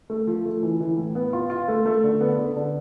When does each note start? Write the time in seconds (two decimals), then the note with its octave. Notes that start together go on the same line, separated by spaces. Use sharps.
0.10 A3
0.27 F3
0.45 A3
0.63 E3
0.81 E3
0.97 A2
1.15 B3
1.33 F4
1.50 F4
1.68 A3
1.86 A3
2.04 D3
2.21 B3
2.39 D3
2.57 D3